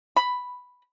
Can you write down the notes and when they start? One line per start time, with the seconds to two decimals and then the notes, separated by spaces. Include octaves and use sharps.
0.16 B5